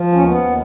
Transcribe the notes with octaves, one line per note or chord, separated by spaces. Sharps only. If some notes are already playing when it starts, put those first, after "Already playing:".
Already playing: F3
D#2 C#4
B3
D#2